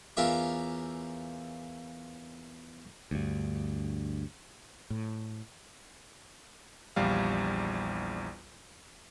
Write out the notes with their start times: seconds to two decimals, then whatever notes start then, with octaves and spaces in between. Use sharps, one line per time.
0.17 E2 C#4 F4 A#4 E5 D6
3.11 D2 G2
4.90 A2
6.96 A#1 E2 G3 F5